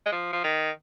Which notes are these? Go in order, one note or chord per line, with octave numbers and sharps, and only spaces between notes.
G#3
F3
F3
D#3